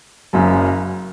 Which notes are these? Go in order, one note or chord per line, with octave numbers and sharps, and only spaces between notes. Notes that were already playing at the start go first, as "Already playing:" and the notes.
F#1 F#2 C#3